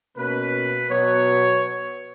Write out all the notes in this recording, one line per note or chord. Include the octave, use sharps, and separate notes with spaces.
B2 A#3 C#4 B4
B2 F#3 B3 C#5